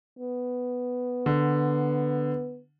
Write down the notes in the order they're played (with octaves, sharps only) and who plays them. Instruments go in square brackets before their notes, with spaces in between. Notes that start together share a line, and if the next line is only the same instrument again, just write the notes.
[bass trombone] B3
[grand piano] D3